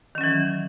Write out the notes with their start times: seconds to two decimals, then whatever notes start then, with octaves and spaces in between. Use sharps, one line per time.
0.15 D#3
0.18 C#4
0.21 F#3
0.24 E3